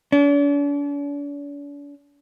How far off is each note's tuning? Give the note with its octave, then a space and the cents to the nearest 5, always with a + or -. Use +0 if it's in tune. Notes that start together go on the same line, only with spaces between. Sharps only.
D4 -45